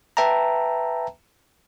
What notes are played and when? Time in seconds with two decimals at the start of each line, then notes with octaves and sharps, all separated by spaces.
0.17 B4 E5 G5 A5 A#5